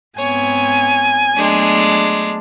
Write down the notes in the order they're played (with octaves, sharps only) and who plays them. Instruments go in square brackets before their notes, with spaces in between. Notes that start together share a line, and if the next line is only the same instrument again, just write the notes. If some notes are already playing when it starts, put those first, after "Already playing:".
[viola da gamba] G#2 B3 C4 [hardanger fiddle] C#5 [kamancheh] G#5
[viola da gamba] F#3 A3 B3 [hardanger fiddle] G#3 D4